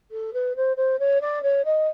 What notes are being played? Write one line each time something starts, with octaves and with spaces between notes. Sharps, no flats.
A4
B4
C5
C5
C#5
D5
C#5
D#5